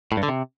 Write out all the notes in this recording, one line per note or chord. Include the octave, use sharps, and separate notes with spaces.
A2
G2
D3
C3